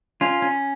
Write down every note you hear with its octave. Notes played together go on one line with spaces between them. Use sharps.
C#4 F4
C#4